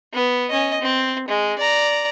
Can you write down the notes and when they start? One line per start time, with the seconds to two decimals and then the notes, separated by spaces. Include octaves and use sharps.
0.13 B3
0.50 C#4 D#5
0.81 C4
1.28 G#3
1.58 D5 A#5